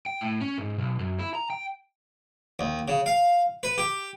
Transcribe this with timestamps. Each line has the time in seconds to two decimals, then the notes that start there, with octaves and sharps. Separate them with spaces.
0.06 G5
0.21 A2
0.41 C#4
0.58 G#2
0.78 B1
0.99 F#2
1.19 E4
1.35 A#5
1.50 G5
2.59 D#2
2.88 C#3
3.06 F5
3.63 B4
3.78 G4